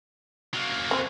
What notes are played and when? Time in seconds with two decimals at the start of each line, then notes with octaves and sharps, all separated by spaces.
0.54 F#3 A#3
0.91 C4 C5